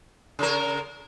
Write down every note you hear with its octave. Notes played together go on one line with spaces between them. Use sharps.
C#3 A#4